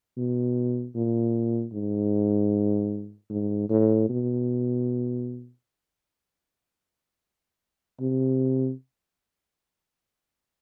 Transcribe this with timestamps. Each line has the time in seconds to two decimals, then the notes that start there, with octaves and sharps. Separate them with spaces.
0.17 B2
0.95 A#2
1.73 G#2
3.30 G#2
3.70 A2
4.09 B2
8.00 C3